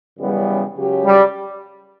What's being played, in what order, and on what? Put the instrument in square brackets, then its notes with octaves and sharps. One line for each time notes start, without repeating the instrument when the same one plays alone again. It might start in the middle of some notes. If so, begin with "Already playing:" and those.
[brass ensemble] F#2 C#3 E3 G3 B3
C#2 C#3 F#3 C#4 G4
[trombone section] G3